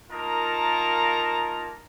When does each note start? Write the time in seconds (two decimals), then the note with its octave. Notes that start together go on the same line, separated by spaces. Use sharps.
0.11 A#3 D#4 F4 A#4 A5 A#5